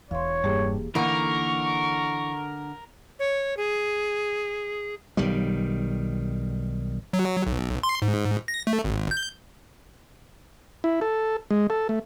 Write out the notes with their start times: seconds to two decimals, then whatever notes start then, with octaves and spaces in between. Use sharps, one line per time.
0.11 E1 E2 C#5 F5 C6
0.44 G2 A#3 G4 G#4
0.95 D3 E3 A#3 D#4 A#4 C#6
3.19 C#5
3.57 G#4
5.17 B1 D#3 G3
7.13 F#3
7.47 B1
7.83 C6
8.02 G#2
8.48 A#6
8.67 A3
8.84 G#1
9.11 G6
10.84 E4
11.01 A4
11.51 G#3
11.70 A4
11.89 A3